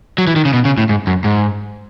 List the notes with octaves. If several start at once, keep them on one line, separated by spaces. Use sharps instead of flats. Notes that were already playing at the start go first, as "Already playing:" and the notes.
F#3
E3
D#3
C#3
B2
C#3
A2
G#2
F#2
G#2